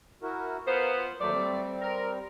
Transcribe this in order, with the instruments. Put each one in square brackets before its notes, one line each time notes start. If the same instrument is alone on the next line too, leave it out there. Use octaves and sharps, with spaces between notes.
[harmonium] E4 F#4 A#4
[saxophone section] B3 C5 [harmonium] F4 A#4
[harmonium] F4
[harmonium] D#2 F#3 C5 [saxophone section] A3 D5
[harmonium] G3 C4
[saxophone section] A#4